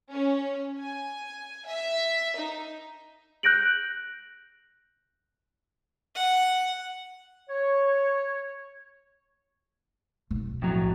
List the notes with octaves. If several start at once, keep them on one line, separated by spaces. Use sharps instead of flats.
C#4
G#5
E5
D#4
F#6 G6 A#6 D7 F#7
F#5
C#5
B1
F2 A2 F#3